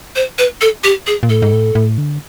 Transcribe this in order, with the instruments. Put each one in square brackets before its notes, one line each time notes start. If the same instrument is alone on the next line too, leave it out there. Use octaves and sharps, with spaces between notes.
[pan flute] C5
B4
A4
G4
G#4
[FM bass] A#2
[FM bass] A2 [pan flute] A4
[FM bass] G#2
A2
A2
D3